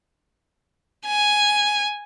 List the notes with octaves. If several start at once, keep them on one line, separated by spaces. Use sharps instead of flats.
G#5